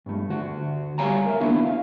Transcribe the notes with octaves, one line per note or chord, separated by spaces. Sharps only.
G2 A3
D2 F#4
G3 A3 C#5 F5 G#5 A#5
A#4 E5
A#3 B3 D4 E4 F#4
F5